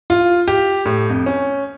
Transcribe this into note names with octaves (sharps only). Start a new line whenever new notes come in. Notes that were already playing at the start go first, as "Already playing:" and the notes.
F4
G4
A2
F2
C#4